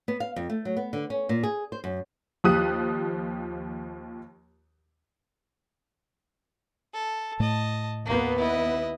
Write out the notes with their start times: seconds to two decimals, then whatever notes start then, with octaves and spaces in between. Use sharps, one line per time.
0.08 B3
0.20 F5
0.36 F2
0.50 A3
0.65 F#3
0.77 B3
0.93 D3
1.10 C#4
1.29 A#2
1.43 G#4
1.72 C5
1.84 F#2
2.44 D#2 F3 G4 D#6 F#6 D#7
6.94 A4
7.40 A2 A3 D#5 A5
8.05 D#2 A#3 B3
8.38 E4 D#5